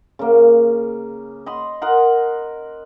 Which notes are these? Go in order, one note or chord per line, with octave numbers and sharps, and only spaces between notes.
C#3 A#3
D#5 B5 C6
A#4 D#5 F#5 C6